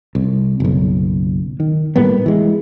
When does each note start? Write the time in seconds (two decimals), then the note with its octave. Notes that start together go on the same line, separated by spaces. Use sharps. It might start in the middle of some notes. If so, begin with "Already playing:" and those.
0.15 C2
0.60 F#1 B1
1.60 D#3
1.96 A2 G3 A#3 B3
2.26 E3 G#3